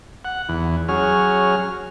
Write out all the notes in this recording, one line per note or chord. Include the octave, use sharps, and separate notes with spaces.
F#5
E2
F#3 C#4 G#4 F6